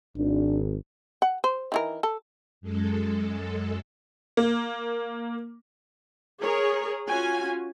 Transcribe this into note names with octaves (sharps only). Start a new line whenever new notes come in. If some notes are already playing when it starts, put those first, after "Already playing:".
G#1 D4
F#5
C5
D#3 E3 A#4
A4
F#2 G#3 A4
A#3
G#4 A#4 C#5
C#4 F4 F#4 G#5